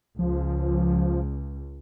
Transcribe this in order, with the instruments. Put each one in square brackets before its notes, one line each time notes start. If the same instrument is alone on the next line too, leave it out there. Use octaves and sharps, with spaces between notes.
[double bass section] C#2 [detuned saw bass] F3